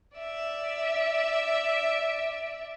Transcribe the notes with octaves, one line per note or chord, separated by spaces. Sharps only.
D5 E5